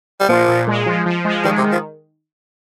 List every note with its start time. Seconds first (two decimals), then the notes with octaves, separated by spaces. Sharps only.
0.20 G3
0.29 A#2 F3
0.48 A#2
0.67 G#3
0.86 F3
1.06 F3
1.25 G#3
1.44 D#3 G3
1.58 C3
1.63 D#3
1.72 F3